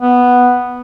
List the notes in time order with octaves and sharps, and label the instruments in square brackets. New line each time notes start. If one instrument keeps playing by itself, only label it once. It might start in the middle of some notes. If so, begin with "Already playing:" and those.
[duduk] B3